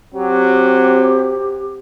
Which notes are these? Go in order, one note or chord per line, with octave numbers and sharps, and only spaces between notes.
F#3 C4 G4